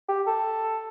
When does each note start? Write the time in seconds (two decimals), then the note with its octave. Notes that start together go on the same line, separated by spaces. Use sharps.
0.08 G4
0.27 A4